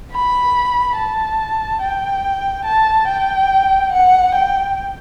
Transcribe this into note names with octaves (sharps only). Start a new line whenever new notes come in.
B5
A5
G5
A5
G5
F#5
G5